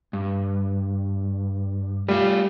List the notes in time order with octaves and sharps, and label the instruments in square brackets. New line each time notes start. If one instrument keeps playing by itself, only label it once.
[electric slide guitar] G2
[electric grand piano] G3 [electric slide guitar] A3 F4